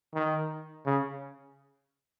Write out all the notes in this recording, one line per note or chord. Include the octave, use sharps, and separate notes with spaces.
D#3
C#3